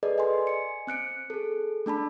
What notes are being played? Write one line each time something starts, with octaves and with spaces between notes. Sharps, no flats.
G#4 A4 B4 D5 D#5
D#5 G#5 C6
G#5 C#7
C4 F#6 C#7 D7
G#4 A4
A3 D4 A5 B5